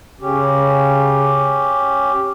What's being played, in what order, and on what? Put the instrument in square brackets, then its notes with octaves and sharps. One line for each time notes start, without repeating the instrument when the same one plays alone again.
[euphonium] C#3 [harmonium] C#4 G4